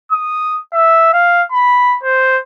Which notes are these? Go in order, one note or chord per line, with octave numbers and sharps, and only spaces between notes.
D#6
E5
F5
B5
C5